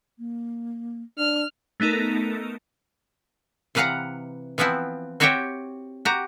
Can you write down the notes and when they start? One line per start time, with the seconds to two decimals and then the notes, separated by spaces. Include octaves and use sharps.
0.19 A#3
1.18 D4 F6
1.80 A3 B3 D#4 A4 A#4
3.75 C3 E3 B4 F5 F#5 A#5
4.58 E3 F3 B3 C4 E4
5.20 C4 F#4 G4 C#5 E5 G5
6.05 F#4 G4 A#5